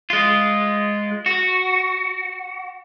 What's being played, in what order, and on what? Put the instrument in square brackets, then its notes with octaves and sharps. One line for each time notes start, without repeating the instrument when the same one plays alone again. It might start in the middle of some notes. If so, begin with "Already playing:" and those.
[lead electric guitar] G#3 F4
F#4